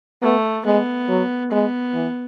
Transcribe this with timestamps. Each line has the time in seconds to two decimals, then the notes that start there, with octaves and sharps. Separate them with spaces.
0.22 A3 B3
0.65 G#3 B3
1.09 F#3
1.51 G#3 B3
1.94 E3